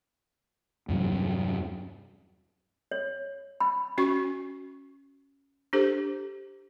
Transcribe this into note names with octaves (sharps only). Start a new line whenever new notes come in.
E2 G2 C3 F#3
C#5
B5
C#4 F#4 C#6
D4 G4 A4 C5